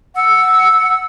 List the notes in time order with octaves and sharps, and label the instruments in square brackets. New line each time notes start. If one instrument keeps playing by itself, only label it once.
[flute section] F#5 E6